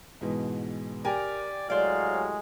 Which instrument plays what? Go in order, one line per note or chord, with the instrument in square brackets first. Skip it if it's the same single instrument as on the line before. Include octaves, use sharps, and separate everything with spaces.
[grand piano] G#2 B2 E3
[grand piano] G4 G5 G#5 [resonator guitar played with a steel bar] A#4 [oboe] D5
[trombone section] A2 F#3 G#3 [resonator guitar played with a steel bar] C5 D5 [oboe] F5